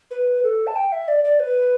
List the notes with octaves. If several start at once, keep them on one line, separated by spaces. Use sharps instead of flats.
B4
A4
A5
G5
E5
D5
D5
B4